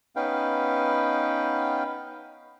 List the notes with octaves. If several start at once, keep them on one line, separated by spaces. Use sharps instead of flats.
B3 C#4 D#4 B4 F5 G5